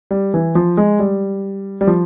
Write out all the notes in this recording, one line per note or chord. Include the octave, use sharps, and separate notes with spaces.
G3
E3
F3
G#3
G3
G3
F3